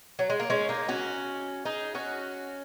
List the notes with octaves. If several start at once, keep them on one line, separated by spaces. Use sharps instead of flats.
F#3
G#3
A#3
G#3 C#4
A#3 D#4
C#4 F#4
D#4 G#4
C#4 F#4